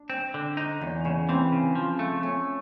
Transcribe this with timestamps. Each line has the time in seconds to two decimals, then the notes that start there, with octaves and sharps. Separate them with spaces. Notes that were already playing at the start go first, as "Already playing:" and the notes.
Already playing: D4
0.10 C4
0.34 D3
0.57 D#4
0.81 E2 C#4
1.05 C#3 C#4
1.29 E3 C4
1.52 C#3
1.75 F3
1.99 A3
2.23 A3 C#4